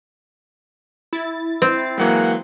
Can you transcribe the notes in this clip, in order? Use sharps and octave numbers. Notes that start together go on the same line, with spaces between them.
E4 A6
C4
E3 F#3 G#3 A#3 F#5